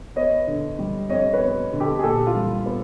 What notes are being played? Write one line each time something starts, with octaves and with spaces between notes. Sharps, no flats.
B3 C#5 D#5
D3
G3
F2 C#5 D#5
B4 C#5
B3
D3
G4 A4
G#4
A#2 G4 A4
F4
G3
B3